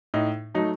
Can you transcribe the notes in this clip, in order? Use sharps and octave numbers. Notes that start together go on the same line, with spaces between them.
A2 D#4
F#3 A3 D#4